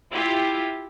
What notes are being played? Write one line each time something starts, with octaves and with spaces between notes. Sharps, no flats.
E4 F4 G4